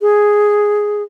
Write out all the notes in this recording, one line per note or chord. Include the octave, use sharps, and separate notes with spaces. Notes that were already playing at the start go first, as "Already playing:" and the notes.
G#4